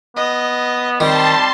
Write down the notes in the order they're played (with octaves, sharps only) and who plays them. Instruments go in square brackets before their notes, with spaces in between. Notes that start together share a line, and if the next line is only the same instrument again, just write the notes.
[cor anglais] B3 [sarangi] D#5
[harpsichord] D#3 [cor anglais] G3 [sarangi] C4 [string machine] A5 C6